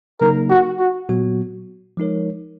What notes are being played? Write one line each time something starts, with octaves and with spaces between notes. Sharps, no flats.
C#3 F#3 A#3 D#4 A#4
F#4
F#4
A#2 F#3 B3 F#4
F3 G#3 D#4 A#4 C#5